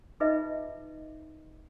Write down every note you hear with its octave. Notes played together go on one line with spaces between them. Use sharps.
D#4 F4 G#4 B4 D#5 E5